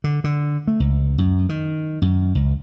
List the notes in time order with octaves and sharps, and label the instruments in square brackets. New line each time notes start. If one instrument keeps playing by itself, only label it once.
[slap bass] D3
D3
A3
C#2
F#2
D#3
F#2
C#2